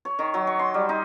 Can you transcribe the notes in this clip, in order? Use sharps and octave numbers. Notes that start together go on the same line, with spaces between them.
C#5
D#3
F#3
C#6
C6
G3
D#4